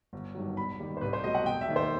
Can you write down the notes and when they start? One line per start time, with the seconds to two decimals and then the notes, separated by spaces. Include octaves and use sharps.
0.13 G1
0.35 G2 D#3 F#3
0.57 E1 B5
0.72 B5
0.80 D#2 D#3 G3
0.97 C5
1.01 C2 B4
1.13 C5
1.23 B2 F#3 A3 D#5
1.35 F#5
1.46 E1 G5
1.61 E5
1.68 D#2 D#3
1.76 C5